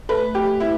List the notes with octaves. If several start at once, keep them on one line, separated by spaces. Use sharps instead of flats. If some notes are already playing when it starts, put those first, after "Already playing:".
A3 B4
G4
E4